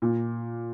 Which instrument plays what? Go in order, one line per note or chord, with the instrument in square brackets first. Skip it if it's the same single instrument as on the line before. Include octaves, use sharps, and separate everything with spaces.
[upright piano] A#2